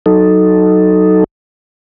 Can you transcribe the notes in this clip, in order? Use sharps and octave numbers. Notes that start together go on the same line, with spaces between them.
F#3 D#4 A4